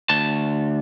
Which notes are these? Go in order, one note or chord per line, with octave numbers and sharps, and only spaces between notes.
D2 A5